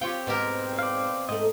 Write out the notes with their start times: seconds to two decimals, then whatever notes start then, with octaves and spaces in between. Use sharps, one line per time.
0.01 C4 F4 G4 C#5 G5
0.27 G#2 B2 G4 A#4
0.79 D5 F5
1.29 G#2 A3 D#5